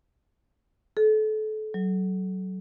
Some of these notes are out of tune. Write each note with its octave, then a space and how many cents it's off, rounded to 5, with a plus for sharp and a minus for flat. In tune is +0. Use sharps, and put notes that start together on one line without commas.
A4 -30
F#3 +25